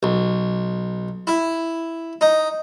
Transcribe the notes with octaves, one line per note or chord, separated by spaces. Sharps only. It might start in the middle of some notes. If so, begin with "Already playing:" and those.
B1
E4
D#4